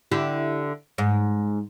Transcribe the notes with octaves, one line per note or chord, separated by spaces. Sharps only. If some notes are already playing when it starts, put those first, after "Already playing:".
D3 E4 G4
G#2